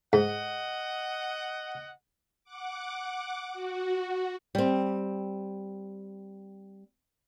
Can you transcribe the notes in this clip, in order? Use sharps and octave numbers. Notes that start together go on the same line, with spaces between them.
G#2 D#5 F#5
F#5 D6
F#4
G3 C4